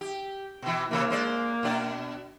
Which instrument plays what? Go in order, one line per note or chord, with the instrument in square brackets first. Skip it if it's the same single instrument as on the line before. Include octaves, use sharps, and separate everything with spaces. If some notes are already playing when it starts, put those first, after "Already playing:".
[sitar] G4
B2 E3
[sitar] C3 E3 [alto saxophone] A#3
[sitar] G#3 C5 D5
B2 D4 D5